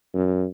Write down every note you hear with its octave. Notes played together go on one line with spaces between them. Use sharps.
F#2